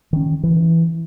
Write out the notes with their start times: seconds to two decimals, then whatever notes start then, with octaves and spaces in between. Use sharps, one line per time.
0.13 D#3 C#4
0.43 E3